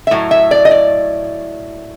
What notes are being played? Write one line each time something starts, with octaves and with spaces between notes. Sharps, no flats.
E5
A2 F#3
E5
D5
D#5
D5